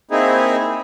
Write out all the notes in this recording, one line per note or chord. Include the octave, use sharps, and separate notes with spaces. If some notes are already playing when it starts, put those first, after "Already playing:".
A#3 C4 D#4 E4 G#4